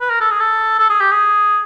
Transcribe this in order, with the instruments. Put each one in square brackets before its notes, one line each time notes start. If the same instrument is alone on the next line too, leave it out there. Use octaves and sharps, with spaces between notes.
[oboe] B4
A#4
A4
G#4
A4
A4
G#4
G4
G#4